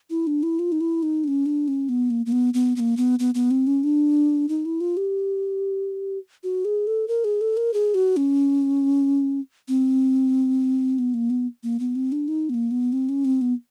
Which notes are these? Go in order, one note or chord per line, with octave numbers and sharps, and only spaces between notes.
E4
D4
E4
F4
D#4
E4
D#4
D4
C#4
D4
C#4
B3
A#3
A#3
B3
B3
B3
A#3
B3
B3
B3
C4
C#4
D4
D#4
E4
F4
G4
F#4
G#4
A4
A#4
G#4
A4
A#4
G#4
F#4
C#4
C4
B3
A#3
B3
A#3
B3
C4
D4
D#4
B3
A#3
B3
C4
C#4
C4
B3